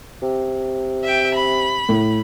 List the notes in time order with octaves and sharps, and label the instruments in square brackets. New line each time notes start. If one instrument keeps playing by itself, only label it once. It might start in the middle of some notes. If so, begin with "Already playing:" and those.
[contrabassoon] C3
[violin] E5 G5
B5
[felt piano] A2